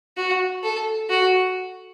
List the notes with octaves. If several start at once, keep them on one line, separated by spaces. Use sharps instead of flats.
F#4
A4
F#4